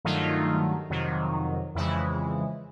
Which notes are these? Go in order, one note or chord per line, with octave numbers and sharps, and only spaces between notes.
G2 D#3 F#3 A3 D#4 F4
F2 C3 D#3 F#3
F2 C#3 E3 G#3 E4